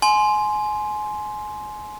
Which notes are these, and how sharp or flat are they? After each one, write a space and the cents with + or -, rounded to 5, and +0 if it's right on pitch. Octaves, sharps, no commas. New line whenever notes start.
G#5 +25 C6 +0